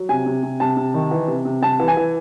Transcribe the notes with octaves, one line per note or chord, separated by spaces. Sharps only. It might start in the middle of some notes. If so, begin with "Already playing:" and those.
Already playing: F#3
C3 G#5
C3
C3
C3 A5
C3
D#3
E3
C3
C3
C3 A5
E3
G#5
E3